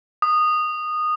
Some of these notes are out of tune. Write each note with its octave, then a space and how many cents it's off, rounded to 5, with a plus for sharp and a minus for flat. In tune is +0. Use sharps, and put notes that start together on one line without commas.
D#6 -15